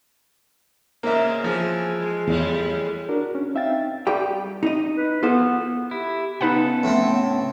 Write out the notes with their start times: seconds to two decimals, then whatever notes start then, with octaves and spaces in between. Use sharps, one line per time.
1.03 G#2 C#3 A#3 E5
1.44 E3 F3 G#4
2.00 G#3
2.28 E2 A2 G3 G#3
3.09 D4 F#4 A#4
3.35 C#4
3.54 C4 D#4 E5 F5 G5 A6
4.07 G3 G4 G5
4.63 D#4 D#5
4.97 B4
5.23 B3 F4 A4 C5
5.91 E4 G4
6.41 C#3 B3 D#4 A4 B4 F#5
6.83 A2 C4